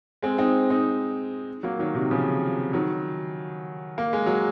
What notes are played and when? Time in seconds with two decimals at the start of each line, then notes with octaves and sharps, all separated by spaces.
0.22 G#3 C4
0.38 C4 D#4
0.70 C4 D#4
1.63 F#3 A#3
1.79 D#3 F#3
1.94 C3 D#3
2.11 C#3 F3
2.73 D#3 F#3
3.98 A#3
4.13 G#3
4.26 F#3